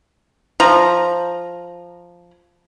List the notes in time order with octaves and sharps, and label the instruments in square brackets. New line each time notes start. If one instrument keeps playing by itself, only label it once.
[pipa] F3 A#5